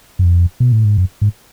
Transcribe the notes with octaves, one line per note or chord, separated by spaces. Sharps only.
F#2
F2
B2
A2
G#2
F#2
G#2